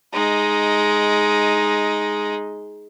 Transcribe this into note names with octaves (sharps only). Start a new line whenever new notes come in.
G#3 D#4